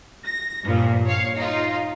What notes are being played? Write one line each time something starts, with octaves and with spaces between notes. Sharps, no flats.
A#6
G2 A#2 F3
C#5 F5
D#4 F4